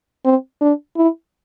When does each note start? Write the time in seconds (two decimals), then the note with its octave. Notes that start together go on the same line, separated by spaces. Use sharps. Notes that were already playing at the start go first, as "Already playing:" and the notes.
0.24 C4
0.61 D4
0.97 E4